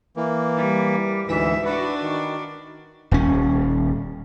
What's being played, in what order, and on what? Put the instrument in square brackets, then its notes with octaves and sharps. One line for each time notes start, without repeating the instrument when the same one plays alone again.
[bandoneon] E3 A#3
[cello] G3
[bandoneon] D2 E3 [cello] G#2 E5
[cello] D4 F#4 [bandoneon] B4
[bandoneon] D#3
[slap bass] D#1 C#4